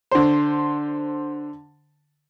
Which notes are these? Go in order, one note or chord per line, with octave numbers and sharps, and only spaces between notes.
D3 C5